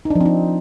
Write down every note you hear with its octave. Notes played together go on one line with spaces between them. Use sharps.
D#4
D4
F3
C4
D#4